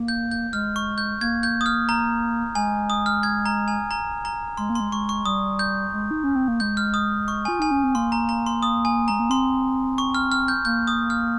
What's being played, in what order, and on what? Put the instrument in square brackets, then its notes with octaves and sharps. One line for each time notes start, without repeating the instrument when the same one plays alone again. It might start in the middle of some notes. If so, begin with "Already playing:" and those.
Already playing: [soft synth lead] A#3
[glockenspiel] G6
G6
[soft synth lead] G#3 [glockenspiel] F6
[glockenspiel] C#6
G6
[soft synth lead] A#3 [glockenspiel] G#6
[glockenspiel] G6
D#6
F6
A#5
[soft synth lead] G#3 [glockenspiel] G#5
[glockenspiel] D#6
F6
G#6
A#5
G#5
A#5
A#5
[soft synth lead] G#3 [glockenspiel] C6
[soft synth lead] A#3
[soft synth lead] G#3 [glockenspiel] C6
[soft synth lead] G#3 [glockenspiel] C#6
[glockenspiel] C#6
[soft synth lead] G3 [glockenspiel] D#6
[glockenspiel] G6
[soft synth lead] G#3
D#4
C#4
C4
A#3
[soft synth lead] G#3 [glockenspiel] G6
[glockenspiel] F6
D#6
C#6
[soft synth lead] F4 [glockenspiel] G#5
[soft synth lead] D#4 [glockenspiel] G#5
[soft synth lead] C#4
C4
[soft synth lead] A#3 [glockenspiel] C6
[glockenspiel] A#5
A#5
C6
D#6
G#5
[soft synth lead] G#3 [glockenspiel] A#5
[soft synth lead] A#3
[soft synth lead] C4 [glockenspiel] C6
[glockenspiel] C#6
F6
F6
G6
[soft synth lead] A#3 [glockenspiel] G6
[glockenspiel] D#6
F6